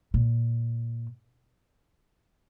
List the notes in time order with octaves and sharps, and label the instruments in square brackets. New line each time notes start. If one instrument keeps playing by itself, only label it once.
[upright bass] A#2